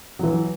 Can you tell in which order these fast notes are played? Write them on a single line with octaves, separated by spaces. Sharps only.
F#3 E3 E4